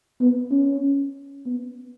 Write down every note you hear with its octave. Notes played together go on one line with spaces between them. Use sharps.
B3
C#4
B3